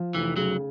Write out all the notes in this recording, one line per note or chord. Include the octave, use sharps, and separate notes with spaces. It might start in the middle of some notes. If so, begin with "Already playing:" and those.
Already playing: F3
F1 E3
C#3 F#3